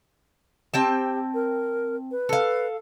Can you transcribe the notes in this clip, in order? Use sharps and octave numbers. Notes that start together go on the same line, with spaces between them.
C4 G4 G5 A5
A#4
B4
A4 F5